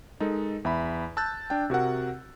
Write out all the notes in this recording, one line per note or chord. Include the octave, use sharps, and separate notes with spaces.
G#3 D#4 A4 A#4
E2 E5 B5
A5 E6 F#6 G6 A6
D4 G5
C3 F#4 A#4 F#5